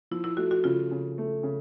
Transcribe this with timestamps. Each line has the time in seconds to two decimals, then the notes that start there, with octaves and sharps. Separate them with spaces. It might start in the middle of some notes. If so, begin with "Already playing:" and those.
0.11 F3 E4
0.24 E4
0.37 A3 F#4
0.51 F#4
0.64 C#3 F4
0.91 C#3
1.18 A3
1.43 C#3